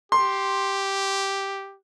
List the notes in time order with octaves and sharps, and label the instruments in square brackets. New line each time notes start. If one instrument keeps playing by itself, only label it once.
[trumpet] G4 [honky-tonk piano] C6